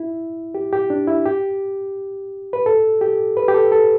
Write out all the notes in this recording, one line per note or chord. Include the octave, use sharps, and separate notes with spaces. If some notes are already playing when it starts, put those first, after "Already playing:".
Already playing: E4
G4
G4
D4
E4
G4
B4
A4
G4
B4
G4
A4
A4